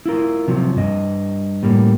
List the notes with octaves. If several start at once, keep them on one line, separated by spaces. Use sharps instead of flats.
E4 F4 A#4
C3 F3 F#3
G2 D#5
A2 G3 A#3